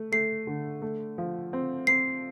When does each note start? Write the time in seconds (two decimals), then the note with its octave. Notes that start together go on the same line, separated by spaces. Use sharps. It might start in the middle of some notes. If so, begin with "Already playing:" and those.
Already playing: A3
0.12 A3 C7
0.47 D3
0.82 A3
1.18 F3
1.53 C4
1.87 C4 C7